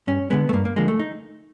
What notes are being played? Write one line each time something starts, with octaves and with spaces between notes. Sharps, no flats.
G2 C#4
D3 F3 G#3 B3
A3
G2 A#3
A#3
D3 F3 G#3 A#3
A3
D#4